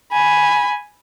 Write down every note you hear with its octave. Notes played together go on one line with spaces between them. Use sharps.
G#5 B5